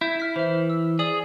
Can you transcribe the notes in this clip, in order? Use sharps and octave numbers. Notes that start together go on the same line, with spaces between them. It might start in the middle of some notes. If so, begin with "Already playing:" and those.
E4 G6
F6 B6
E3 C5 E5
E6
G#4 D5 D#6 F#7